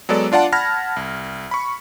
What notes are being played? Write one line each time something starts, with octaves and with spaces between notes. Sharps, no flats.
F#3 G#3 B3 A4 D5
D4 F4 D5 F#5 A5
F#5 A5 B5 F6 G#6 A#6
C2
B5 C#6